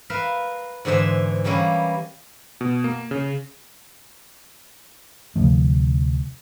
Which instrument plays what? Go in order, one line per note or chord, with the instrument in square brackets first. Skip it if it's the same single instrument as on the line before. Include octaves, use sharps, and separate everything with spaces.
[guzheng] A#4 B4 E5 F5
G#2 D3 E3 C5 E5
E3 G3 A#3 C#4 E4
[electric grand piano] B2
A#3
C#3
[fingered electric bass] D2 C3 F3 A3